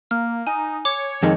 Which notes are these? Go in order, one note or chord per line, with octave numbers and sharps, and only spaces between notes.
A#3 F6
D#4 G#5
C#5 D6
F2 D#3 G#3